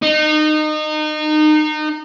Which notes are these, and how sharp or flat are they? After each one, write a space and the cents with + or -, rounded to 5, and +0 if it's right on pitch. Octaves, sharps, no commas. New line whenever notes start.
D#4 -25